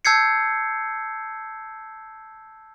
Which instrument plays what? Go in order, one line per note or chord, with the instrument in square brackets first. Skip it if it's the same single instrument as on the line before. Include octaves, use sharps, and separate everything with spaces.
[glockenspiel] A5 E6 G6 G#6 C7 C#7